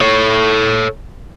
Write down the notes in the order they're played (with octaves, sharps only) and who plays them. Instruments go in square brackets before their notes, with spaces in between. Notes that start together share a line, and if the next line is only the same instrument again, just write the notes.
[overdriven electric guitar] A4 C#5